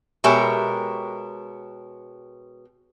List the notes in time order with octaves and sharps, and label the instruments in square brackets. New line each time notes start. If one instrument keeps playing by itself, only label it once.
[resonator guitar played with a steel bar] B2 G#3 G4 A#4 C#5 E5